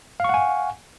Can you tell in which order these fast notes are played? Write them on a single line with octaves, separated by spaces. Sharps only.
F5 C#6 F#5 G#5